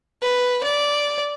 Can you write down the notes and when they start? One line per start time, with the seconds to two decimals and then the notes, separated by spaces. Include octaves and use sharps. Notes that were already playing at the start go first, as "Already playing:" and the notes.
0.22 B4
0.63 D5